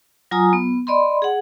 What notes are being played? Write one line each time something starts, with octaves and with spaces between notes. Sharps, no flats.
F#3 F4 G#5 A#5 D#6
B3
D5 D#5 B5 C6
G#4 F#5